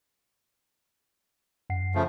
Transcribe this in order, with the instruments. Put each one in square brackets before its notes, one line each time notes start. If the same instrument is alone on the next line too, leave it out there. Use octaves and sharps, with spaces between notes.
[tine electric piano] F#2 F#5 C7
[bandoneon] C#3 F3 A3